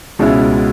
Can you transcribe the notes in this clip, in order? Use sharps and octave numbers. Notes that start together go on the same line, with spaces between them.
C#2 B2 G#3 C#4 E4